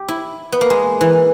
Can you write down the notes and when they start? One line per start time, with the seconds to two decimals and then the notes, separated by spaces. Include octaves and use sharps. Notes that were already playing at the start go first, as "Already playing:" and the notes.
Already playing: G4
0.08 E4
0.52 B3
0.61 A#3
0.70 G#3
1.01 E3